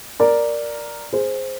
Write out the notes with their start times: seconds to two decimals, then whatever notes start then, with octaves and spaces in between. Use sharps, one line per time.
0.20 A#4 D5
1.13 G#4 C5